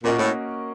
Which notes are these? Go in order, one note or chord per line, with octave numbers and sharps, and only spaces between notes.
A#2 A#3 C#4 F#4 A#4 D#5
A2